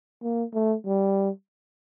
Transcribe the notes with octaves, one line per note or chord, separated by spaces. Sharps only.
A#3
A3
G3